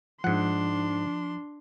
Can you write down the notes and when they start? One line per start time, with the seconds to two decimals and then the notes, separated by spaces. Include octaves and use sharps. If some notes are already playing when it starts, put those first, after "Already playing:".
0.24 G#2 F3 D4 F#5 C6